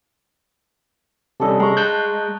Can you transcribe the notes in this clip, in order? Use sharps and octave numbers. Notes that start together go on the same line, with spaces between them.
C3 G3 C#4 D4 A4 D#5
G#3 A#5 C#6
A5 F#6 G6